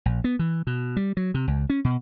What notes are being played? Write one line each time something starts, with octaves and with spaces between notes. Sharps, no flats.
A#1
B3
E3
B2
G3
F#3
C3
C#2
C#4
B2